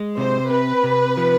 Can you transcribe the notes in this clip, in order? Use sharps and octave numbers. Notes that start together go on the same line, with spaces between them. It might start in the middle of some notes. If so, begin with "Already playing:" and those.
Already playing: G#3
C3 C5
C4 B4
C3
F3